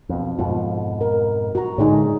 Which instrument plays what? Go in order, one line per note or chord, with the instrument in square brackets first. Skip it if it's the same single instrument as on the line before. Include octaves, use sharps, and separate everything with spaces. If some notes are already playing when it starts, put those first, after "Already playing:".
[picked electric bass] F2 B2
[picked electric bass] F2 G#2 B2 [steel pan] F4
[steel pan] A#4
F#4 A#5
[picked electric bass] A2 D3 G#3 [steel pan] D#4 G#4 C#5